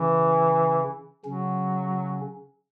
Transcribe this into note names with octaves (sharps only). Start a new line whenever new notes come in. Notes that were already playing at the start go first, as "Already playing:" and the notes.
Already playing: C#3 E3 C#4
C#3 F#3 C#4